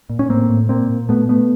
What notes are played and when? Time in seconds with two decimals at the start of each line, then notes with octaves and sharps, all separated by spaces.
0.10 A#2
0.19 C#4
0.29 A2 A#3 C4
0.49 A2
0.69 A#2 A#3 C4
0.90 A#2
1.09 B2 A3 B3
1.29 B2 A3 B3